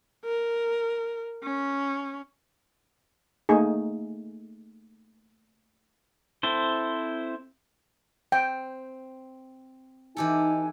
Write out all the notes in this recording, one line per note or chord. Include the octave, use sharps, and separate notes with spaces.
A#4
C#4
A3 A#3 D#4 G#4
C4 E4 A4 C5
C4 G5
E3 D#4 G4 A4 G#5